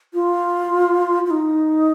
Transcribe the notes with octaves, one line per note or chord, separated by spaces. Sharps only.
F4
F4
D#4